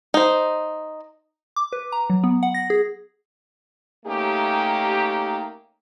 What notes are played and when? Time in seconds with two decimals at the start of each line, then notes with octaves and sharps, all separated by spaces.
0.14 D#4 C5
1.56 D6
1.73 B4
1.92 A#5
2.10 F#3
2.24 B3
2.43 F#5
2.54 A#6
2.70 G#4
4.06 A3 A#3 C#4 D#4 G4